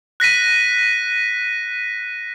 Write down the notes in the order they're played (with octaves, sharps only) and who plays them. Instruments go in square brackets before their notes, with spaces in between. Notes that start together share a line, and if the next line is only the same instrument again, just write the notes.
[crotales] F#6 A#6 B6 D#7